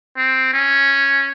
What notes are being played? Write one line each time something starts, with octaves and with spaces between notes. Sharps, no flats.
C4
C#4